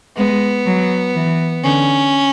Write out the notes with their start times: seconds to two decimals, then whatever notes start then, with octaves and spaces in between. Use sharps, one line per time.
0.17 G#3 B3
0.66 F#3
1.15 E3
1.64 D3 C#4